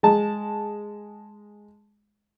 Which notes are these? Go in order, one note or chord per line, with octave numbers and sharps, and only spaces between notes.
G#3 A5